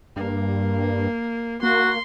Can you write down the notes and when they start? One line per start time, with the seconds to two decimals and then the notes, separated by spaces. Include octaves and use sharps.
0.16 G2 A#3
1.63 A#3 F#4 C6